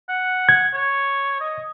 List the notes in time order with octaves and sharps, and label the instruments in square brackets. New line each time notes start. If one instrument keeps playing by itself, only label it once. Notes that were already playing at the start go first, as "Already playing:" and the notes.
[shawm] F#5
[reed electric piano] G#6
[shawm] C#5
D#5